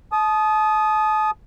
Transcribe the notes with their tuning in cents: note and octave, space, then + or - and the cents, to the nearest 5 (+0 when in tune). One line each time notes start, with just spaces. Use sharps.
A5 -35 D#6 +0